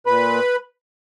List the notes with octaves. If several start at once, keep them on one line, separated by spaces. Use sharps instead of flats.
A#2 B4 B5